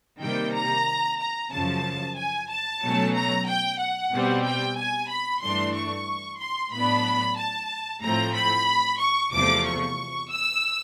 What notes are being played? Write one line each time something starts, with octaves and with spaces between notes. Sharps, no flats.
C3 D#3 G3 A#3 G5
A#5
A#5
F#2 C#3 F3 A5
G#5
A5
B2 F#3 A3 C#4
A#5
G5
F#5
B2 G3 C4
G5
G#5
B5
G2 E3 A3 D4 C6
C#6
C6
A2 F#3 B3 D4 B5
A5
A2 F3 A3 C4 A#5
B5
C#6
E2 C3 F3 A3 D6
C#6
E6